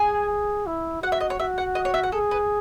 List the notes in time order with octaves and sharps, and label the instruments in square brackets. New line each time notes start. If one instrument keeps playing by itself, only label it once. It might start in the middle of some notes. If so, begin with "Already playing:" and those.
Already playing: [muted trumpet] G#4 [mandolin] G#5
[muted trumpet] E4
[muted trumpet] F#4 [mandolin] F#5
[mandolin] E5
D#5
C#5
[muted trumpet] F#4 [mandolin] E5
[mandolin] F#5
D#5
C#5
E5
F#5
[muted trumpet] G#4 [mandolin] A4
[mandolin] B4